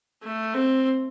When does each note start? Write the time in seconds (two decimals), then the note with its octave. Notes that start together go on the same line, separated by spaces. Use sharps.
0.23 A3
0.54 C4